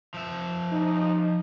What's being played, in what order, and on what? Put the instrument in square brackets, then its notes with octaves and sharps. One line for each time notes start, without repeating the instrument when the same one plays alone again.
[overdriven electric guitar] F3 E5
[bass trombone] D#4